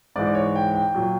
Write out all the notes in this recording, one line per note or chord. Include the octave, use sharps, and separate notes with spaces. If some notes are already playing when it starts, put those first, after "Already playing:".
G#2 E3 D5
C#5
G5
G5
A#2 F#3